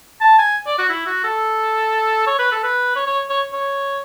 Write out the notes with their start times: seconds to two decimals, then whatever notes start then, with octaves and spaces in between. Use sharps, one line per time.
0.21 A5
0.38 G#5
0.66 D5
0.78 F#4
0.89 E4
1.06 F#4
1.24 A4
2.27 C#5
2.39 B4
2.52 A4
2.63 B4
2.96 C#5
3.07 C#5
3.29 C#5
3.53 C#5